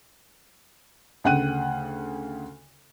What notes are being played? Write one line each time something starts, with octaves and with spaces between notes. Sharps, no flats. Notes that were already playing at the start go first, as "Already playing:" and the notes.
D2 C#3 F#5 G5 F#6 D#7